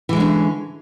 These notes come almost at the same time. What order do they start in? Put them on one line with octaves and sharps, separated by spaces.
E3 G#3 D3 C#4